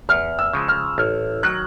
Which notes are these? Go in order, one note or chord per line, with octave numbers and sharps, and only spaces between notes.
E2 F6
E6
C#3 F3 G#3
F6
A1 F6
D#3 F#3 F#6